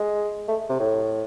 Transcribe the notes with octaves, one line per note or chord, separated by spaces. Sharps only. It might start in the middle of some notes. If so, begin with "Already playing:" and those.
Already playing: G#3
A3
C3
A2